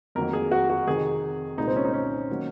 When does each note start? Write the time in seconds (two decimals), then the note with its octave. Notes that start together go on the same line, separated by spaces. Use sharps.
0.15 F2 D#3 F#3 A#3 A#4
0.33 G#4
0.51 F#4
0.70 F#4
0.87 F2 C3 D#3 G#4
1.57 C2 A#2 G#3 D#4
1.67 C4
1.76 C#4
1.85 D#4
1.93 C#4
2.30 D#3 F#3 A#3